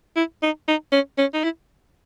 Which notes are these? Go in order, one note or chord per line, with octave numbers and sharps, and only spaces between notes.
E4
D#4
D#4
C#4
C#4
D#4
E4